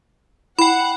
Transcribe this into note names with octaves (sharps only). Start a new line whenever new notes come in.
E4 F#5 G5 B5